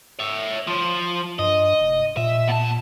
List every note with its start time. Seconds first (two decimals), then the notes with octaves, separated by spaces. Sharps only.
0.19 C#5 E5
0.67 F3
1.39 G2 D#5
1.81 F1
2.17 A#2 E5
2.48 B2 A5